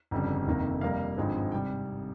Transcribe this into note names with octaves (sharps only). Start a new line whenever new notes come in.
G1 F2 C#3 G3
F1 F2 D#3 A#3
F2 C3 G3 A#3 F5
G#1 G2 F3 G#3 C4
G5
C3 G3